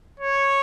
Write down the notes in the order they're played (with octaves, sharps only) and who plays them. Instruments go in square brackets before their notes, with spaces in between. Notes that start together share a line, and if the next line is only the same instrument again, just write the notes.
[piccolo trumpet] C#5